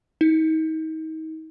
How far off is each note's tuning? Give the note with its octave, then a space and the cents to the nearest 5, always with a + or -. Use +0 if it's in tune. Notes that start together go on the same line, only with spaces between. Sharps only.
D#4 +35